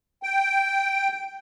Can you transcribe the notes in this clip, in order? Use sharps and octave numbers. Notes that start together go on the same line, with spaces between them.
G5